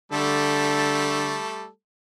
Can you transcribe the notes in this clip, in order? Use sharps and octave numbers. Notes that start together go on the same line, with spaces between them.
D3 G3 A3 A4